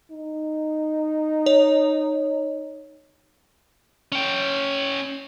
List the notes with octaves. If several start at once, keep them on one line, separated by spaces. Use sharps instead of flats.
D#4
C#5
C#4 G5